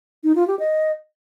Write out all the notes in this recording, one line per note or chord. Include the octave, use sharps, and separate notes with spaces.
D#4
F4
G4
D#5